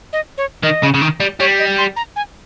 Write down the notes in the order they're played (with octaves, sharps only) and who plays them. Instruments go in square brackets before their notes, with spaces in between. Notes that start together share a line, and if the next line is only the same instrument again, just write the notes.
[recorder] D#5
C#5
[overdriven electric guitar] D#3 [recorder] D#5
[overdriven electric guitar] C#3
C#3
D#3
G3
[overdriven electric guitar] G3 [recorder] C#5
[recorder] D#5
C6
A#5
G#5